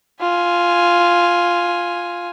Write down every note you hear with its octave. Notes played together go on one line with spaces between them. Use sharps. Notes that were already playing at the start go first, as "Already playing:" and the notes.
F4 G#5